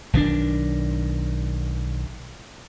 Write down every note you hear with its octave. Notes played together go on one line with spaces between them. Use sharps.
B1 D#3 F#3 D4